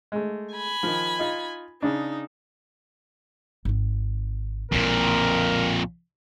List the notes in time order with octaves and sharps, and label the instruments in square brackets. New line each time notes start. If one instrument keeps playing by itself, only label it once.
[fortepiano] G#3 A3
[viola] G#5 B5
[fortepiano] D#3 F3
D#4 F4
[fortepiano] C#3 D4 [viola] D#4
[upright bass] G#1 C4
[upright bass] B1 E4 [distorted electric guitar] F2 A#2 [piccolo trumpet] A#4